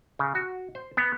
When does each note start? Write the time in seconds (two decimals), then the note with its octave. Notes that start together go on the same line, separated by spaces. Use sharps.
0.19 C#3
0.35 F#4
0.75 C5
0.97 B3